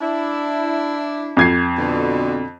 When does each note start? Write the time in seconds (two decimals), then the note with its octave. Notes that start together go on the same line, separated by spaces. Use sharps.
0.01 D4 E4
1.37 F2 G#6 C7
1.78 B2 D3